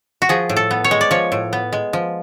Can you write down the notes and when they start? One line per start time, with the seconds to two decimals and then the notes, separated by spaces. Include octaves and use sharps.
0.22 F#4
0.29 F3 G#4
0.49 A2
0.56 A4
0.71 B3
0.84 C#5
0.91 G#3
1.01 D5
1.11 F3 C#5
1.32 A2
1.53 B3
1.73 G#3
1.93 F3